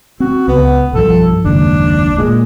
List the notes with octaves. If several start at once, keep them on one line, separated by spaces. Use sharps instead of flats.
C4 F#4
C#2 B3
B1 G2 F3 A4
F#1 D#2 G#2 D4
A#2 G#3